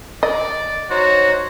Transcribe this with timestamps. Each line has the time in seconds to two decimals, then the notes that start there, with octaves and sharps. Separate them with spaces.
0.23 D5 D#5
0.90 D#4 F#4 C5 C#5